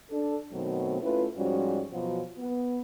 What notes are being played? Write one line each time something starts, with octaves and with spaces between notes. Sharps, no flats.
D4 A4
B2 D#3 F#3 A3 C4
A3 C#4 E4 F4 B4
G#2 F3 G3 C#4 F#4
B2 F3 F#3
B3